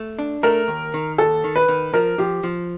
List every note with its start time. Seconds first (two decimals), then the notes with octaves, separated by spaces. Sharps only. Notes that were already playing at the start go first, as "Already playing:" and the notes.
Already playing: A3
0.19 D4
0.43 A3 A#4
0.68 D#2
0.94 D#3
1.18 D#2 A4
1.44 D#3
1.56 B4
1.68 D#3
1.94 F3 A#4
2.18 F3 G4
2.43 F3